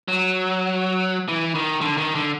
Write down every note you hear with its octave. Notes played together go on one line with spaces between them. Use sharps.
F#3
E3
D#3
D3
D#3
D3